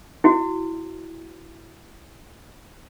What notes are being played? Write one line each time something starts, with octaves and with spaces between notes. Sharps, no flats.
E4 F#4